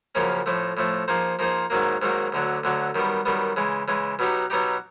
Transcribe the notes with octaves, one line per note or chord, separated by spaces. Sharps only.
F#2 C#3 F3 A#3 C#4
A2 F3 A3
A2 F3 A3
F3 A#3 D#4 G#4 C5
F3 A#3 D#4 G#4 C5
G#2 D#3 F#3 A#3
G#2 D#3 F#3 A#3
D2 D3 F#3
D2 D3 F#3
F#2 D#3 G3 B3
F#2 D#3 G3 B3
C#3 E3 G#3
C#3 E3 G#3
B2 F#3 B3 D#4 G4
B2 F#3 B3 D#4 G4